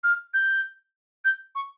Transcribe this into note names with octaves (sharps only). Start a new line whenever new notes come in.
F6
G6
G6
C#6